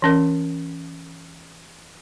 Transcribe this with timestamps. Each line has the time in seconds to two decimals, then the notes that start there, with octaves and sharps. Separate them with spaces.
0.02 E3 C#4 A#4